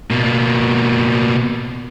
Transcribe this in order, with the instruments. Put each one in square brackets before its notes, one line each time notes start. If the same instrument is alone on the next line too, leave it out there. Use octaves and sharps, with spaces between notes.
[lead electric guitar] B2 A#3